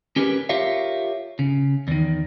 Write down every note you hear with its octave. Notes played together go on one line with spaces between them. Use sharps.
C#4 G4 G#4 A#4 B4
F4 G4 A#4 C#5 E5 F5
C#3
E2 D#3